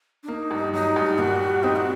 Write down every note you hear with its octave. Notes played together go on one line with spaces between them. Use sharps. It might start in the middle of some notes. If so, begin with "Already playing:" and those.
D4
A#3 D#4
G2
F#3 D#4
G2
A#2 F#4
G3
C4 D#4
F#4